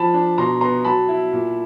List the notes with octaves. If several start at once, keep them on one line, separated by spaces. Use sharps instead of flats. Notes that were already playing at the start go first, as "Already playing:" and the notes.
Already playing: F3 A5 B5
D4
B2 A#5 C6
B3 A#5 C6
F#3 A5 B5
E4
A#2